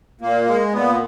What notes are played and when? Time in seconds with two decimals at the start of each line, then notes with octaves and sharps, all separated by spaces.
0.21 A#2 A#3
0.47 G#3
0.73 A#2 B3